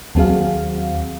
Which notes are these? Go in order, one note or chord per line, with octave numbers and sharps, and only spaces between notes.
D#2 F#3 C4 F#4 G#4 F5